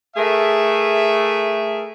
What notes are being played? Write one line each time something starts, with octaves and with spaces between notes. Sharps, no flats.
A3 G#4 A#4 E5